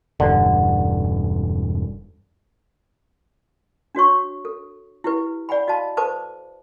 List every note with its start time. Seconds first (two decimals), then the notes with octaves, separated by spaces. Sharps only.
0.20 E1 G2 D3
3.95 D4 F#4 C#5 C#6
4.45 A4
5.04 E4 G4 B4
5.49 D5 F#5 G#5 B5
5.67 F#4 D#5 F5 A5 B5
5.97 A4 B4 C5 A5 D6